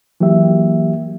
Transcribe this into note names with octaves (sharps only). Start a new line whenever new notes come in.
E3 F#3 A#3 G4 E5